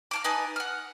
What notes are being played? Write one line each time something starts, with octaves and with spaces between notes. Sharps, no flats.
F5 A5 D6
D#4 B4 G#5 A5
F#5 F6